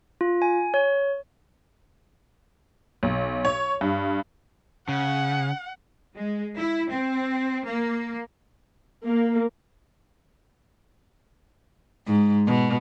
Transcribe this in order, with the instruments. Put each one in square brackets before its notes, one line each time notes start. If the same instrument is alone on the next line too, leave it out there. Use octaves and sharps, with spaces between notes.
[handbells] F4
G#5
C#5
[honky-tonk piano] B1
C#5
G2
[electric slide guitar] C#3 [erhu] F#5
[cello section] G#3
E4
C4
A#3
[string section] A#3
[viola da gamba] G#2
B2